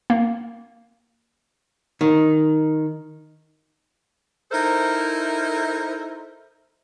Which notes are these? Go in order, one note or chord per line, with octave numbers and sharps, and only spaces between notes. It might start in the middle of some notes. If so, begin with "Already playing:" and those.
A#3
D#3
D#4 E4 A4 A#4 C5 E5